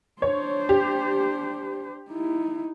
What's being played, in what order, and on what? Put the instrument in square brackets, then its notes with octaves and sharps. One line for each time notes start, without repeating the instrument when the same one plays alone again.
[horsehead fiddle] D4 C5 [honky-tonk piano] C#5
[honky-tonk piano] G4
[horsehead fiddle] D#4 E4